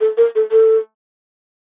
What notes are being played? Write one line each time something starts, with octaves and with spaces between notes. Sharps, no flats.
A4
A#4
A4
A4